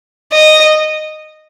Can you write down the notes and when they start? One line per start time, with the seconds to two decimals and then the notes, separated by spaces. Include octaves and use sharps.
0.33 D#5